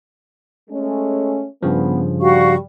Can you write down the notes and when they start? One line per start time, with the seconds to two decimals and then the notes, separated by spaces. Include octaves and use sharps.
0.70 G#3 A3 C#4
1.63 G2 C#3 F3 B3
2.20 G3 F#4 F5 C#6